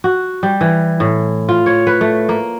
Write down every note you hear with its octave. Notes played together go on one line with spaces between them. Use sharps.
F#4
G3
E3
A2
F4
C#5
B4
A3
A#3